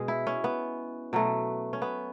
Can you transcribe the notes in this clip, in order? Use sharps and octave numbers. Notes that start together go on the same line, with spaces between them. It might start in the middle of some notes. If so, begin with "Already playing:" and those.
Already playing: B2 G#3 G#4
E4
C#4
B3
B2 F#3 A3
C#4
B3